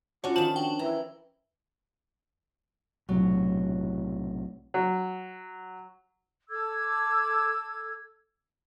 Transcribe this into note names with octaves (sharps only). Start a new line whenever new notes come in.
C#4 D4 F4 F#4 C#5
D#3 F3 A5 E7 F#7
D4 F#4 G5
E3 E4 A#5
B1 A2 C3 F#3
F#3
A4 D6 E6 G#6